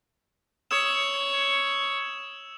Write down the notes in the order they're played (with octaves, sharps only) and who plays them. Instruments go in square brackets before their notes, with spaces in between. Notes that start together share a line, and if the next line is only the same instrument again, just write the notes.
[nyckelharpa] C#5 [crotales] D#6 E6 E7